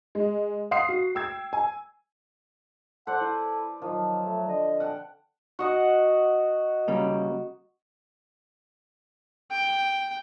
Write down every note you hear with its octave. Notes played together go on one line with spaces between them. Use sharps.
G#3
F5 F#5 C6 D#6 C7
F#4
G5 E6 G#6
G#5
A4 C5 D5 F#5
E4 B4
D#3 F3 F#3
A3
D3 D#5
F#5 G5 A5
F#4 D#5 F#5
C#3 G3 A#3
G5